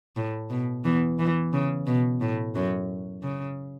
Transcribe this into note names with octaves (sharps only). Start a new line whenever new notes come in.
A2
B2
E2 E3
E2 E3
C#3
B2
A2
F#2 F#3
C#3